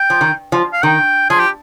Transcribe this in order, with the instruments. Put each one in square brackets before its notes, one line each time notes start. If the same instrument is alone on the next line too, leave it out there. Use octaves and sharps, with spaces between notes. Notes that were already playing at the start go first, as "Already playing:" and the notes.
Already playing: [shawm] G5
[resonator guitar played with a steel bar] F3
D#3
F3
[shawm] F5
[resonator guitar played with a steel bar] D#3 [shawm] G5
[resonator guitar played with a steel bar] F3 [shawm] G#4
[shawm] G4